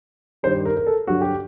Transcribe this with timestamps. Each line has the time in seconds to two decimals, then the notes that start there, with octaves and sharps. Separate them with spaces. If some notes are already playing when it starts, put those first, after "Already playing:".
0.43 G2 D#3 G3 C5
0.65 A#4
0.77 A#4
0.87 A4
1.07 G2 D3 F#3 F#4
1.21 G4